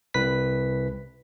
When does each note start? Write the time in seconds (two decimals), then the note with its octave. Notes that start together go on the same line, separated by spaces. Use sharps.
0.14 C2 B4 B6